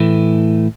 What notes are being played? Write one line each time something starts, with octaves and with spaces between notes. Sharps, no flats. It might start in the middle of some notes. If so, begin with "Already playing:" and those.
Already playing: A2 E3 A3